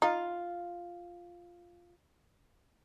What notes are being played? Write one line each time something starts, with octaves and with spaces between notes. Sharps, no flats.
D#4 F4 F5